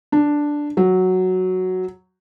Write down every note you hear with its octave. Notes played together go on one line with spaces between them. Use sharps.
D4
F#3